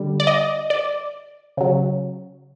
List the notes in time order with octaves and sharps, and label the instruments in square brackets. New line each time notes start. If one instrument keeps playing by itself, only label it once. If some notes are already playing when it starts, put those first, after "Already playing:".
Already playing: [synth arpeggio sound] D3 G3
D5
D#5
D5
C#3 F#3